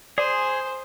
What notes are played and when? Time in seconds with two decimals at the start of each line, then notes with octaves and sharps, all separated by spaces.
0.18 G#4 C5 D5 G#5